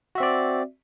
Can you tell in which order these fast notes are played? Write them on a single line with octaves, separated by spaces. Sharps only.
F#4 E5 C4 D5